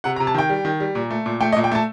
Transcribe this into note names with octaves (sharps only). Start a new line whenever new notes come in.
C3 F#5
A#5
C3
A5
D#3 G5
G3
D#3
G3
A#2
A3
A#2
A3 G5
D#5
A#2
G5
A3 A5